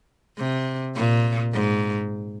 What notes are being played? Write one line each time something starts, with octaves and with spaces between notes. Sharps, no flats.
C3
A#2
G#2